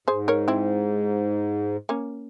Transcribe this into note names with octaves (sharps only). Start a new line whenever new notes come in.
G#2 G#4 C5
A#4 C#5
C4 E4
A#3 C#4